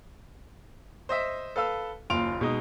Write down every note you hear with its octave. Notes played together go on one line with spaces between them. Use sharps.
C5 D#5 E5
A4 B4 F5 E6
F#1 D#2 F4 C6 D7 F7
B2 G#3 D#4